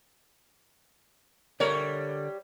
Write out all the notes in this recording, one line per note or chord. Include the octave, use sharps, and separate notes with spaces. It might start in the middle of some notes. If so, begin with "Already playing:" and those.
D3 G3 A#4 C#5 E5